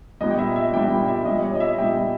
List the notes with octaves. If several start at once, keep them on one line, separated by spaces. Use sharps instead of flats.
A#2 G3 B3 D#5
G5
E5
E5
A#2 G3 B3 G5
G5
E5
A#2 G3 B3 D#5
C#5
D#5
E5
A#2 G3 B3 G5